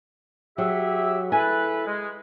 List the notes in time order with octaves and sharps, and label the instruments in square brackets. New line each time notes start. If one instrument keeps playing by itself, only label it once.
[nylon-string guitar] F#3 [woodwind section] G4 G#4 E5
[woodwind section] E4 A4 B4 [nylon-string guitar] G#5
[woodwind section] G#3